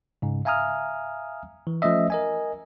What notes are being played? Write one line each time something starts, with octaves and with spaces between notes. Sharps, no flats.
G#2 C#3
E5 F5 G#5 A#5 D#6 F6
E3
F3 A3 C#4 D#5 E5
A#4 D#5 G#5